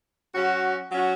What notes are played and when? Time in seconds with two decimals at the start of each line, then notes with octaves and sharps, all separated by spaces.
0.35 F#3 C#4 F#4
0.91 F#3 C#4 F#4